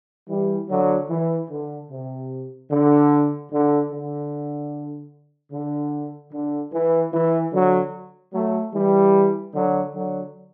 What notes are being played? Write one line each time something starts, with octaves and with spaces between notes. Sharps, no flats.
E3 G3
D3 F#3
E3
D3
C3
D3
D3
D3
D3
D3
E3
E3
D3 F#3
F#3 A3
E3 G3
D3 F#3
D3 F#3